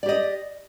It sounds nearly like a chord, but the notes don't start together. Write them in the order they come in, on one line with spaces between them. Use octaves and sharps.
D5 G4 D#5